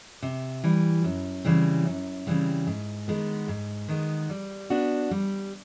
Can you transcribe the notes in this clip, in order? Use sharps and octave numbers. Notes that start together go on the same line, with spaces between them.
C3
E3 G3
F#2
C#3 E3 G3 C4
F#2
C#3 E3 G3 C4
G#2
D#3 G#3 B3
G#2
D#3 G#3 B3
G3
B3 D4 F#4
G3